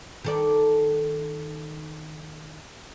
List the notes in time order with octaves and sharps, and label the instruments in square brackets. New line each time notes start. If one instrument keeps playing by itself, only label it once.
[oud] D#3 A4 D5